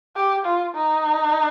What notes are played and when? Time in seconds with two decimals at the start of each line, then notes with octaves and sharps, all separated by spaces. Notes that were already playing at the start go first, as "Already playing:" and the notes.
0.16 G4
0.45 F4
0.75 D#4